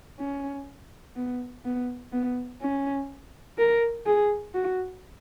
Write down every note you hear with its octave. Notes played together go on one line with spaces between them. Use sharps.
C#4
B3
B3
B3
C#4
A#4
G#4
F#4